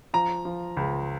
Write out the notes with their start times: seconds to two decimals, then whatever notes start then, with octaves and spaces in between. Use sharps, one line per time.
0.14 F3 A#5
0.45 F3
0.77 C#2